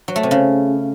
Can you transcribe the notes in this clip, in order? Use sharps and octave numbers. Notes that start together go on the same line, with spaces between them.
F#3
A3
C3
C#3